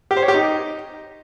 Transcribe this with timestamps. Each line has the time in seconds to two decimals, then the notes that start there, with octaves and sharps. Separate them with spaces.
0.11 G4
0.17 C5
0.22 C#5
0.28 G4
0.34 D#4